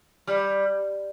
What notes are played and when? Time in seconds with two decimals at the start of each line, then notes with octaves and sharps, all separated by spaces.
0.27 G3